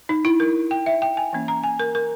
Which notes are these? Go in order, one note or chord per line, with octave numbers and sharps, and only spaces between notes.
D#4
E4
A#4
G5
E5
G5
G#5
E3 A#3 C#4
A#5
G#5
A#4
A#4